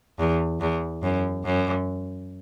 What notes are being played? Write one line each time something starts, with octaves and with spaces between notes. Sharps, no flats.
E2
E2
F#2
F#2